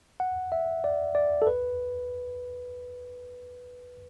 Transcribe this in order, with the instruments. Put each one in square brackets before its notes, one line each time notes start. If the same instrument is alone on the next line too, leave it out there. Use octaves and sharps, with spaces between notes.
[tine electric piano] F#5
E5
D5
D5
A4
B4